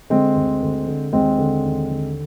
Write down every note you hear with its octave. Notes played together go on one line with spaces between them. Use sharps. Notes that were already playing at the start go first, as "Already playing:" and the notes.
D3 G#3 C4
D2
D2
D3
D#2 G#3 C4
D3
D#2
D3